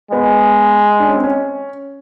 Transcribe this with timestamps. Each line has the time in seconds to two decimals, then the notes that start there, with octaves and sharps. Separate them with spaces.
0.11 G#3 B3
1.00 D4
1.08 C#4
1.16 C4
1.24 C#4